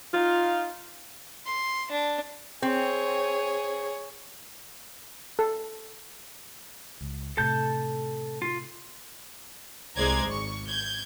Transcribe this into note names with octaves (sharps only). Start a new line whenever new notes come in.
D#4 F4
C6
D4
C4 G#4 C#5
A4
C#2
A2 C3 A4 A5 G6
F4
C2 G#3 C5 D5 A#5 G#6
G#1 C#6
G6 G#6